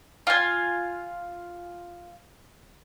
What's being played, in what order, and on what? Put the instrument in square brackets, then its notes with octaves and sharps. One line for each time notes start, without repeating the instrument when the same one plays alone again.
[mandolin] F4 G#5